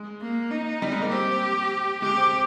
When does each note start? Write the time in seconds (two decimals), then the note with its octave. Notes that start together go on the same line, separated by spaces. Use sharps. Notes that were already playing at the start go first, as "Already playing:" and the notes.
Already playing: G#3
0.22 A#3
0.51 D#4
0.82 G3
0.92 G#3
1.02 A#3
1.11 C4 G4
2.02 G#3 G4
2.17 C4